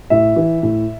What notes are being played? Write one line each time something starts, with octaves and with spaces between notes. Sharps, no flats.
A2 E5
E3
A2